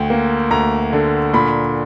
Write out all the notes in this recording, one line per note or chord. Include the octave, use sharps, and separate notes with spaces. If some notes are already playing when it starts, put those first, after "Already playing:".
Already playing: D2 G5
A#3
D2 A#5
D3
A#2 B5